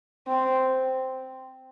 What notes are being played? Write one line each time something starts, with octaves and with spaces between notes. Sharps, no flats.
C4